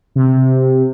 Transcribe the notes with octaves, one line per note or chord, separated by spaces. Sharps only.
C3